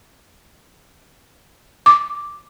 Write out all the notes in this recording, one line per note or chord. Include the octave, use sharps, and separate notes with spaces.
D6